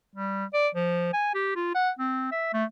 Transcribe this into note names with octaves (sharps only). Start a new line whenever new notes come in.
G3
D5
F3
G#5
G4
F4
F#5
C4
E5
A3